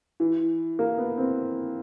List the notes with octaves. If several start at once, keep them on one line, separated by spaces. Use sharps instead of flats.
E3
A#3
B3
C4